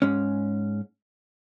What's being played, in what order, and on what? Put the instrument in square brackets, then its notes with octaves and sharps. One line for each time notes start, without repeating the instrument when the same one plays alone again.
[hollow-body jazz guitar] G#2 G#3 C#4